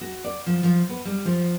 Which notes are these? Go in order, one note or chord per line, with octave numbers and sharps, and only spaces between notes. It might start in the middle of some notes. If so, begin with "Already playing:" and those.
F#4
D5
F3
F3
B3
G3
F3